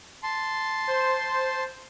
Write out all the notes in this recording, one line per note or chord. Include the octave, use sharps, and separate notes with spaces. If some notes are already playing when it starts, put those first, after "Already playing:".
A5 C6
C5